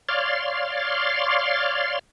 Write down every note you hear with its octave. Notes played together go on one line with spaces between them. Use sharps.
C#5 D5 F5 C6